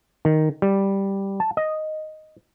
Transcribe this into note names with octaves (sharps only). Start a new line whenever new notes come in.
D#3
G3
A5
D#5